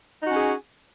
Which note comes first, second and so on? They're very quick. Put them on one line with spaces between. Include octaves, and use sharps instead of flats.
D#4 F#4 C#4 G#4